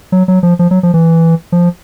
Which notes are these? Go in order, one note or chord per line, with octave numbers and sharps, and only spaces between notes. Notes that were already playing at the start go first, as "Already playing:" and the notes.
F#3
F#3
F3
F3
F#3
F3
E3
F3